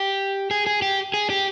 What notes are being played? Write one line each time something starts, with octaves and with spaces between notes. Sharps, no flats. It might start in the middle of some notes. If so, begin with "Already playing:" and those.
Already playing: G4
G#4
G#4
G4
G#4
G4